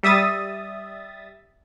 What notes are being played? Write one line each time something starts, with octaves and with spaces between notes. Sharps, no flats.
G3 E5 D#6 A6